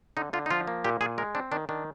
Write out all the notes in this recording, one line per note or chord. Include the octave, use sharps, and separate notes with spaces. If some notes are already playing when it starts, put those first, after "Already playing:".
D3 D#4
D3 F4
D#4
F3 F4
A#3
A#2 G4
A#2 G#4
G#3 A#4
C4 D4
D#3 D4
D#3 D4